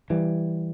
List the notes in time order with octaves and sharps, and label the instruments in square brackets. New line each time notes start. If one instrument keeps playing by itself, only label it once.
[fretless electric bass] E3 G3